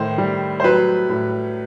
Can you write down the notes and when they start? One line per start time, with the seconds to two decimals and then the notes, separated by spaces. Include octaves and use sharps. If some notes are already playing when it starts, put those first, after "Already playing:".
Already playing: A2 D#3 C5
0.18 G3
0.60 C5
0.64 F#3 B4
1.10 A2